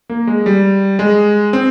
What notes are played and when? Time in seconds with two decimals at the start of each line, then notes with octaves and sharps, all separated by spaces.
0.10 A#3
0.27 G#3
0.46 G3
0.99 G#3
1.53 C4